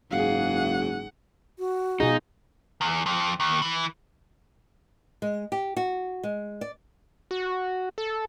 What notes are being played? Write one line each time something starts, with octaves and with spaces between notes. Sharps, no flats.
F#1 G#2 G#4 F5 F#5
F#4
B2 D#4 F4 G#4
E2
F2
D#2
E3
G#3
G4
F#4
G#3
D5
F#4
A4